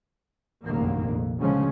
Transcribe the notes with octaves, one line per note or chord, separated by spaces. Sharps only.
F1 A#1 F#2 A#2 D#3 A#3
F2
D2 C#3 E3 F3 G#3 C#4